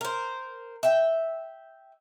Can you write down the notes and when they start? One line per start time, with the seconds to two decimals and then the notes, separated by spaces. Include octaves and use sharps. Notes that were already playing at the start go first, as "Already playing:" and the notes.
0.01 A#4 C5
0.83 E5 G5